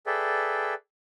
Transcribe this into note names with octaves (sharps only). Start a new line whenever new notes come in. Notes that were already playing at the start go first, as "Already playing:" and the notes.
G#4 A4 B4 D5 E5 G5